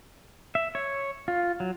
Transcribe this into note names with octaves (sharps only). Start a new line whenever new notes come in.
E5
C#5
F4
F#3